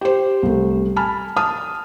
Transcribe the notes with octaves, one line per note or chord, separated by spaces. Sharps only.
G4 C5
C2 A3
G#5 A5 B5 F6
A5 D#6 F6